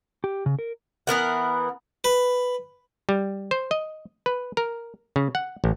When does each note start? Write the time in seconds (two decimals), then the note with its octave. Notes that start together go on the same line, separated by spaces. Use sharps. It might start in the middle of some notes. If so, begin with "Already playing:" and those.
0.24 G4
0.46 C#3
0.59 A#4
1.07 E3 B3 A#4 F#5
2.04 B4
3.09 G3
3.51 C5
3.71 D#5
4.26 B4
4.57 A#4
5.16 C#3
5.35 F#5
5.64 A1